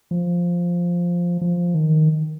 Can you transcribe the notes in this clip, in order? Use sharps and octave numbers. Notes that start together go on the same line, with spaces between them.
F3
F3
D#3